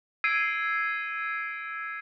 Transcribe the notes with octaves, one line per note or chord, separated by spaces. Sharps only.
E6 G#6 C7 D7 D#7